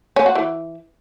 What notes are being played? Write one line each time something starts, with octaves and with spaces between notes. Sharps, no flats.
C#4
F#4
E3